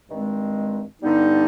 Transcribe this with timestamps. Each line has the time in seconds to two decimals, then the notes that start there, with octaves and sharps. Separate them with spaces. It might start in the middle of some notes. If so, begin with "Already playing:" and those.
0.09 G2 D#3 G#3 C4
1.02 G2 D3 G3 B3 D#4